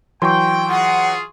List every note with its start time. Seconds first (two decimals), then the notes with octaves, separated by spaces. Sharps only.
0.22 E3 F#3 G5 C6 C#6
0.69 F4 G#4 F#5